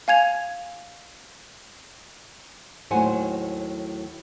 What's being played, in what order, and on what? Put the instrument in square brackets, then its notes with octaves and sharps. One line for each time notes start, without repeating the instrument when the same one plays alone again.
[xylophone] F5 G#5 G#6 F7
[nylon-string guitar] D#2 A2 F#3 C5 F#5 G#5